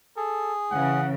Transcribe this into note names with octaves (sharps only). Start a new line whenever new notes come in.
G#4 A4
C#3 E3 F#5